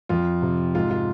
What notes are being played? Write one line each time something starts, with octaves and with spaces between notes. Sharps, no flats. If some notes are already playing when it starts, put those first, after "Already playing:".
F2 F4
C3
G#2 F4
F4